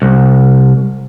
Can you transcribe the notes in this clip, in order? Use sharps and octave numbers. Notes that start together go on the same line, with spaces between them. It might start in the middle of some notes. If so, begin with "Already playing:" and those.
C2